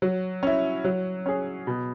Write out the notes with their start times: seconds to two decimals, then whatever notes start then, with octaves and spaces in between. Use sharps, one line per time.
0.02 F#3
0.43 C#4 E4
0.85 F#3
1.26 C#4 G#4
1.67 B2